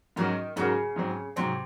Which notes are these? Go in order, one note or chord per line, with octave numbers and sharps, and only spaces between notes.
G#2 D#3 F#3 C#4 F#4 A#4
G#2 C#3 F#3 C#4 F#4 A#4
G#2 F#3 C4
G#2 C3 F#3 C4